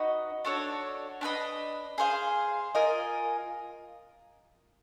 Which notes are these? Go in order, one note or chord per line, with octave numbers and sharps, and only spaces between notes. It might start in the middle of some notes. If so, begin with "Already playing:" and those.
Already playing: D#4 F#4 B4 D#5
D4 F#4 A4 C#5
D4 G4 B4 D#5
G#4 C5 F5
F4 A#4 D#5 G#5